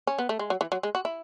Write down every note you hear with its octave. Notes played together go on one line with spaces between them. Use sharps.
C#4
B3
A3
G#3
F#3
E3
F#3
G#3
F#4
E4